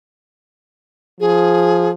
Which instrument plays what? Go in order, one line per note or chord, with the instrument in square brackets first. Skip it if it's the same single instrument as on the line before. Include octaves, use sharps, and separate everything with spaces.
[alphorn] F3 [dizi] G#4